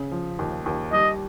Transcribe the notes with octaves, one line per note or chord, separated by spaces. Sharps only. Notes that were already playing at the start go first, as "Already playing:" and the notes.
Already playing: C#3
F3
D#2
D#2
G3 D#5